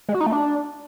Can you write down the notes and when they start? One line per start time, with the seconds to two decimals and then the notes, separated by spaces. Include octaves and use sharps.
0.09 G#3
0.15 F#4
0.21 D#4
0.26 A3
0.32 D4